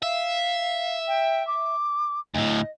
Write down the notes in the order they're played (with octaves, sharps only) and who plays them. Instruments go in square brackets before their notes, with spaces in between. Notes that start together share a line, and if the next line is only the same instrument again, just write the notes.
[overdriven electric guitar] E5 [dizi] F5
[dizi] G5
D6
[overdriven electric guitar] D2 A2 [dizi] D#5